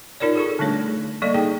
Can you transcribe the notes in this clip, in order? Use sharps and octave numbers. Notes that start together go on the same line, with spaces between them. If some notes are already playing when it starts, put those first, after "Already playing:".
D#4 F4 A#4 C#5 D5
G#4 A4 C#6
D3 G3 A3 D4 C#5
G3 A#3 A4 D5 D#5
D#4 G#4 G5